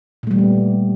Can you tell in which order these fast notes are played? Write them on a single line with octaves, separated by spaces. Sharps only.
A#2 A3 G3 E3 B3